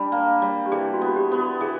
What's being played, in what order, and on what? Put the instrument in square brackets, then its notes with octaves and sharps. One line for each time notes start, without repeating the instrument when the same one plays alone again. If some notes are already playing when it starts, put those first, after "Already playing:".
Already playing: [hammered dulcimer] G3 D4
A#3
G3
[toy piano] G4
[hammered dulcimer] E3 [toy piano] G#4
[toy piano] F#4
[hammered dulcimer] B3
[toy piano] F#4
G4
[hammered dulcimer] B3
[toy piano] F#4
[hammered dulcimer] E3 [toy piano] G#4